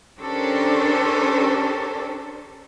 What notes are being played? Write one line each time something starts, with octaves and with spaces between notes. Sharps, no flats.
C#4 D4 G4 A4 A#4 C5